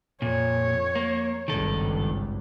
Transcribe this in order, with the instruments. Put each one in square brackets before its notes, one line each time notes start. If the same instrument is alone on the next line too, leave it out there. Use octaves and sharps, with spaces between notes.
[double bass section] F2 [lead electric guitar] A#2 [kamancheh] C#5
[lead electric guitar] A#3
[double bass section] G#1 C#2 G2 [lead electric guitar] D#3 A4